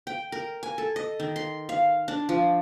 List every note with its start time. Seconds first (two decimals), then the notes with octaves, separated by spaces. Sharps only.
0.07 G5
0.32 A#4
0.63 G#5
0.78 A4
0.96 D#5
1.20 D#3
1.36 C6
1.69 F5
2.08 D4
2.29 F3